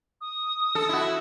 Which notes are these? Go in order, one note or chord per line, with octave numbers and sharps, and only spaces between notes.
D#6
A4
E4 F#4